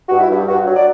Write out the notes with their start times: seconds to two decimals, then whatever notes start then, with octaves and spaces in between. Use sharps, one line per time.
0.09 G2 F#4
0.20 E4
0.30 G2
0.48 G2 F#4
0.67 F#3
0.77 D5